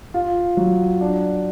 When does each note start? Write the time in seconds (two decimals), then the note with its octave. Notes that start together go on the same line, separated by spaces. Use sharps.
0.14 F4
0.57 F#3
1.01 D4